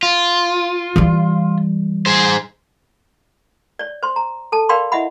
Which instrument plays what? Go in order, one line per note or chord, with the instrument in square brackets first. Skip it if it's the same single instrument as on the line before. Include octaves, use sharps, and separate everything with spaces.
[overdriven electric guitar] F4
[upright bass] E3 G3
[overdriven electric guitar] G#4 C5
[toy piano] C#5 D5
C5 C6
A#5
A4 A5
A#4 D5 F5 G5 B5 C6
E4 D#5 E5 F#5 B5